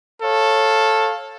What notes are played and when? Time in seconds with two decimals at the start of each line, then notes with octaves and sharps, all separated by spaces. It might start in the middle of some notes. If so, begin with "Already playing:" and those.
0.22 A4 C#5 F5